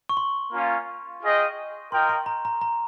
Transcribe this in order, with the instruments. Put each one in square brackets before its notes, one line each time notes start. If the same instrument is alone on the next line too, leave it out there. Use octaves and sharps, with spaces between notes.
[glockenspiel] C#6
C6
[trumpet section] A#3 C#4 F4
F4 G#4 D#5 G5
[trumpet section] F4 A#4 D#5 G5 [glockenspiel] C6
[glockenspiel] C6
A#5
A#5
A#5